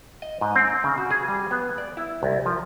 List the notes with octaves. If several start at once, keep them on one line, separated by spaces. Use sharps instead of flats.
D#5
G#2
C4
C#3
F#4
G#4
G3
B3
D5
E4
C2
F3